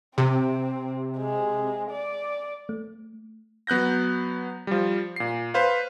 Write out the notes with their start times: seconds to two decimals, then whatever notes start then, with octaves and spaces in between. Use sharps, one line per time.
0.18 C3 C4
1.18 G#3
1.91 D5
2.69 A3
3.67 F#3 B3 F#6 G6 A#6
4.67 F3 G3
5.16 A#2 C7
5.54 B4 C5 F5